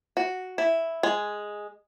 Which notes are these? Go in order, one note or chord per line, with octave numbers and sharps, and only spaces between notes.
F#4
E4
G#3